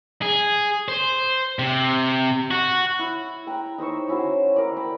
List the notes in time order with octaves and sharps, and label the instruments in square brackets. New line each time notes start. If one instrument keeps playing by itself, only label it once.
[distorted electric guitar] G#4
C5
C3
F#4
[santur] E4
G5 A#5
D#4 C5 E5 C#6
C#4 E4 F#4 C5
A#4 D5
G5 A#5 B5 D6